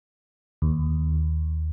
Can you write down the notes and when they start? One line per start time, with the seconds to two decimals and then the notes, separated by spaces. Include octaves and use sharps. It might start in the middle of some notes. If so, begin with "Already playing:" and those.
0.62 D#2